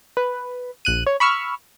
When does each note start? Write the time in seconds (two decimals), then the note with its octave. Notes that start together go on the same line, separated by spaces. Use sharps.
0.17 B4
0.85 A#1 F#6 D#7
1.07 C#5
1.20 B5 C#6 E6 F6